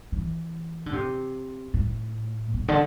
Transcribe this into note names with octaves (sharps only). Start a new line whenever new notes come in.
E3
D3
C3
A2
B2
D3